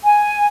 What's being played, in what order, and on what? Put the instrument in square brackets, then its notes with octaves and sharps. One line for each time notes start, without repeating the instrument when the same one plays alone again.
[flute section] G#5